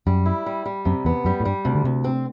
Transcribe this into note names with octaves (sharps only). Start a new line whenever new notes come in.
F#2 G3
E4
G3
G3
F#2 C3
E2 B3
F#2 G3
A2
G2 G3
D2 C3
D3
D2 C3
C4